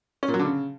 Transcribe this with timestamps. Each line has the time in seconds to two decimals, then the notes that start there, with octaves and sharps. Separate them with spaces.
0.23 C#4
0.28 A#2
0.34 F#3
0.39 D3
0.45 C#3